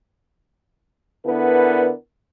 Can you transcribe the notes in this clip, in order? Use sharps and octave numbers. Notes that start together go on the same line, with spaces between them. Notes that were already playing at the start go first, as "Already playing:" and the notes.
D3 B3 D4 E4 A#4 B4